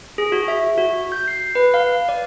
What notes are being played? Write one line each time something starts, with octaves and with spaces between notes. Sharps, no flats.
G#4
F#4
E5
F#4
G6
C7
B4
F5
D5